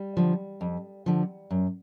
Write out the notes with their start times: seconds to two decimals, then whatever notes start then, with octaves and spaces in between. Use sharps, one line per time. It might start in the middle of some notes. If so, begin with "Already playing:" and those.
Already playing: G3
0.17 D3 F3
0.61 F2
1.06 D3 F3
1.51 F#2